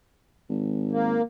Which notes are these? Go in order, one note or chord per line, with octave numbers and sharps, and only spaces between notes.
G#1
A#3